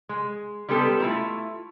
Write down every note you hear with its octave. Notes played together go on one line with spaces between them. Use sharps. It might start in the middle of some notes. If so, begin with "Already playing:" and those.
G#3
G3 G#3 B3 G4 A4
A3 E4 F4